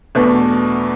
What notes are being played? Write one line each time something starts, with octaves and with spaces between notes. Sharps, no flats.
E2 B2 A3 D4